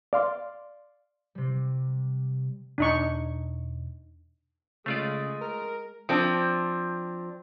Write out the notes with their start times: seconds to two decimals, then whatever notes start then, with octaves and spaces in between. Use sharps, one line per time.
0.13 D5 F5 C6
1.35 C3 G3
2.78 E2 B2 D4 D#4 C#6
4.86 C#3 G#3 A3 F4 D5
5.41 A#4
6.09 F3 C4 D4